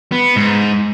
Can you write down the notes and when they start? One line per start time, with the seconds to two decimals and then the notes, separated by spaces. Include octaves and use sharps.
0.12 B3
0.36 G#2